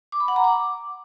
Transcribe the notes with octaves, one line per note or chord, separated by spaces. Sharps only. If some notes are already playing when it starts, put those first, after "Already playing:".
D6
B5
F#5
A#5
D6